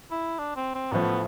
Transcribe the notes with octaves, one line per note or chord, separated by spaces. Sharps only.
E4
D4
C4
C4
A1 A2 F3 A3 B3